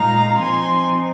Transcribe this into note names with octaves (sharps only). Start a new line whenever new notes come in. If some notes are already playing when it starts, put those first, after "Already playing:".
Already playing: A#2 G#3 D#4 F5 A#5
F3 C4 D#4 G#5 C6